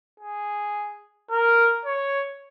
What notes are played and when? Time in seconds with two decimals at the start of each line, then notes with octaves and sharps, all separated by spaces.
0.20 G#4
1.31 A#4
1.85 C#5